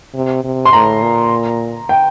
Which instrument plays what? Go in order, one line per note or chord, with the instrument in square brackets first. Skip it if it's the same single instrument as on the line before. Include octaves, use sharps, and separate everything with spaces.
[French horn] C3
C3
[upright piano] C6
[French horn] A2 [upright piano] A#5
[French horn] A#2
[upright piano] G5